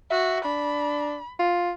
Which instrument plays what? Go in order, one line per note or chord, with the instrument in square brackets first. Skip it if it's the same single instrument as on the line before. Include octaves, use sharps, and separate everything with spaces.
[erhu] F#4 [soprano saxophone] E5
[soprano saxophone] D4 [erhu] B5
[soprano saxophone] F4